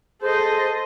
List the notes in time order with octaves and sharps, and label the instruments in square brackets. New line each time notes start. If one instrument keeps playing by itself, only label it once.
[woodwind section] G#4 C5 [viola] A4 D#5